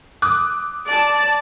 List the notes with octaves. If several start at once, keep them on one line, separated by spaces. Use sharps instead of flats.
D6 D#6 F#6
D5 A5